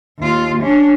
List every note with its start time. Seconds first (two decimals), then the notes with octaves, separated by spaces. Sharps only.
0.19 D#2 F4
0.62 C#4 D4